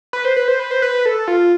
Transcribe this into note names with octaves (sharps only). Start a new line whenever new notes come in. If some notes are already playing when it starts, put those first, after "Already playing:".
B4
C5
B4
C5
B4
C5
B4
A4
F4